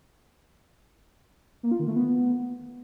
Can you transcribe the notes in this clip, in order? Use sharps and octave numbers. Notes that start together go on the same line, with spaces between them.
A#3
F4
D#3
A3
B3